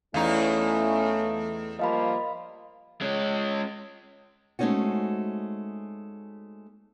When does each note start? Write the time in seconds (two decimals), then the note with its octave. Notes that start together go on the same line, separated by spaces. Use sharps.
0.14 E2 A3 C#4 D#4 E4 F5
1.79 F3 G3 A#3 D#5 F5 B5
3.01 G#3 C#4
4.59 G#3 A3 C4 C#4 D#4 F#4